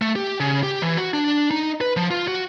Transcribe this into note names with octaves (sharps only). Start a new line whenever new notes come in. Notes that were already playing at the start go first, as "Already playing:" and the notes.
A3
G4
C#3
G4
E3
F#4
D4
D#4
B4
F3
F4
F#4